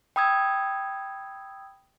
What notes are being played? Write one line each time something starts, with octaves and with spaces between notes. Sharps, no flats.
G5 B5 D#6 E6 G#6